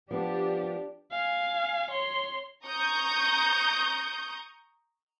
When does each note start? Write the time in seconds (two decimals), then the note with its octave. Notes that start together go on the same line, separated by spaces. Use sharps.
0.11 F3 B3 D4 G4
1.12 F5 G#5
1.91 C#5 C6
2.66 A#5 C#6 D#6 G6